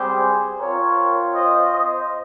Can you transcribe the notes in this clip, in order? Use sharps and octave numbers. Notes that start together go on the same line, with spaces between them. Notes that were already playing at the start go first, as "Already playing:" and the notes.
Already playing: G3 C4 G4 G#4 C5
C4 F4 A#4 C#5
C5 D#5
C5 D#5